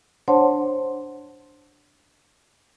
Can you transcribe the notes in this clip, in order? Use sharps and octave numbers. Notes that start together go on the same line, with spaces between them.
D4 C5 C#5 F#5 A5 C6